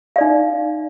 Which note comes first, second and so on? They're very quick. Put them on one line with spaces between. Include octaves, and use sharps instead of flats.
F5 D5 D#4